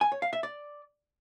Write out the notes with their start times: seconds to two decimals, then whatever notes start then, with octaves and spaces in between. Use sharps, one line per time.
0.01 G#5
0.12 C#5
0.22 F5
0.33 E5
0.43 D5